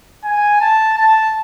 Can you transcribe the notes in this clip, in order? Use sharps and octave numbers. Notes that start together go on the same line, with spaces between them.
G#5
A5
A5